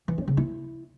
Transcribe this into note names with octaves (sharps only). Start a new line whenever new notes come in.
E3
C#4
C#3
E4